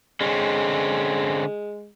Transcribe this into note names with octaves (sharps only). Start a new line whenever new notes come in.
D3 G#3 C4 C#4